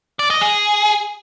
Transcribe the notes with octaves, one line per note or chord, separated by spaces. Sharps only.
D5
D#5
G#4